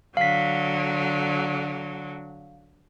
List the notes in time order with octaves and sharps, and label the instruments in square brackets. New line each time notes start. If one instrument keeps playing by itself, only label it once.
[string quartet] D3 F#3 [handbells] F5 B6